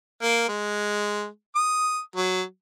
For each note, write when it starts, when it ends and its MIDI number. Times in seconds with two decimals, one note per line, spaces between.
0.22 0.45 58
0.49 1.27 56
1.55 2.00 87
2.16 2.42 54